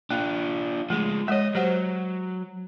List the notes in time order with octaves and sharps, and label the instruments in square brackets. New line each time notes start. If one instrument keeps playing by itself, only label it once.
[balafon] A#3 [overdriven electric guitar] D4 F4
[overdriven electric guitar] F3 G#3 [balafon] A3
[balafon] G#3 C#5 [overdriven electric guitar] D#5 E5
[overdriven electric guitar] F#3 [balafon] G4 C5 F#5